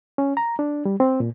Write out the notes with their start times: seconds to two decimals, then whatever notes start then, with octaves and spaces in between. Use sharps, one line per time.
0.18 C#4
0.37 A#5
0.59 D4
0.85 G3
1.00 C4
1.20 A#2